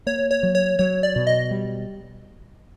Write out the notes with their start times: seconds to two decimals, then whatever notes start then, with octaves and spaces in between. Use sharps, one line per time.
0.06 A#3 C#5
0.31 C#5
0.43 F#3
0.55 C#5
0.79 F#3 C#5
1.03 D5
1.16 B2
1.27 D#5
1.51 G3